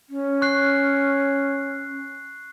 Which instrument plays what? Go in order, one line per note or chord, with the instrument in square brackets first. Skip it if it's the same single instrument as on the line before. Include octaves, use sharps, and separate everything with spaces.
[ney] C#4
[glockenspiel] C#6 F#6 C7